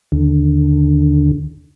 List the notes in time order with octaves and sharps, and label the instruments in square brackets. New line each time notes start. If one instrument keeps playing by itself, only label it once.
[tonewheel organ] D#2 D3